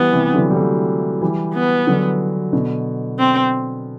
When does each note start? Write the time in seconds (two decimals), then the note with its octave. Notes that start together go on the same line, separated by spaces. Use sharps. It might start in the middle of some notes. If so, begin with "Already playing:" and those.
Already playing: E3 G3 B3
0.12 C3 E3
0.34 D3 F#3
0.50 G3
0.56 F#3 A3
1.22 E3 G3
1.54 B3
1.87 D3 F#3
2.53 B2 D3
3.19 C4